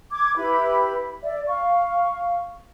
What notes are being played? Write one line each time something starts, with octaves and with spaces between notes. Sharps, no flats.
D6 G#6
E4 G4 B4 B5
D5 E5
F5 C#6